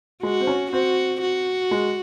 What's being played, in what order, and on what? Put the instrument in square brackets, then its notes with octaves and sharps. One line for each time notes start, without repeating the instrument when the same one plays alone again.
[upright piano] G#3 [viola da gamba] F#4
[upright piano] C4
C#4
[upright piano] C4 [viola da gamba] F#4
[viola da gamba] F#4
[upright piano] G#3